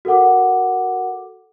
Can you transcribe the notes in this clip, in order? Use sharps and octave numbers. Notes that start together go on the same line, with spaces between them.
F#4 A4 A#4 F#5 D6